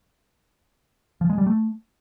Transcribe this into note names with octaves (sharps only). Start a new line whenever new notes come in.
F3
G#3
G3
A3